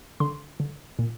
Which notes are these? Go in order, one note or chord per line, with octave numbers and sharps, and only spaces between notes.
D3 C6
D3
A#2